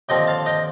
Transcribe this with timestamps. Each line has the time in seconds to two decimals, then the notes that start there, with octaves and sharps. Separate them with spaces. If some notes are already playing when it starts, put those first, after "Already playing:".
0.09 D#2 D3 F3 C4 D#5 G5
0.27 F5 A5
0.46 D#5 G5